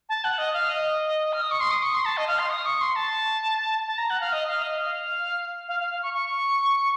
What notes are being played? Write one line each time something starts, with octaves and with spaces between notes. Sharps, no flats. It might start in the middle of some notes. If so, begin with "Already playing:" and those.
A5
F#5
D#5
F5
D#5
F6
D#6
C#6
C6
D#6
C#6
C6
A5
D#5
F5
C6
D#6
C#6
C6
A5
A5
A#5
F#5
F5
D#5
F5
D#5
F5
F5
F5
F5
C#6
C#6